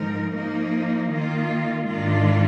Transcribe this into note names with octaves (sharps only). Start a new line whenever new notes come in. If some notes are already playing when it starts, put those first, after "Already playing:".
Already playing: G#2 F3 G#3 D#4 A#4
F3 A#3 D#4 A#4
D#3 A#3 F4
G#2 D#3 G#3 D4 F4